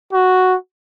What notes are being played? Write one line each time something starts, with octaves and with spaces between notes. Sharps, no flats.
F#4